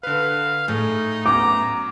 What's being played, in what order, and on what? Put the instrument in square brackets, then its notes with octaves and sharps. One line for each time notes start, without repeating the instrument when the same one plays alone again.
[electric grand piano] D3 B4 [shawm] F5
[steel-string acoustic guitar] A2 [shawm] D#4 [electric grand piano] G#4 A4
[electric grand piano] F#3 B3 C#4 [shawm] A#5 [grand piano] D6